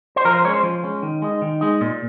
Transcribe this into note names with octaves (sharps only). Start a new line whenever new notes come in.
C5
F3 A#4
C5
G#3 C#4 C#5
C5
F3
G#3 C#4
D#3
G#3 D#4
D#3
G#3 D#4
A#2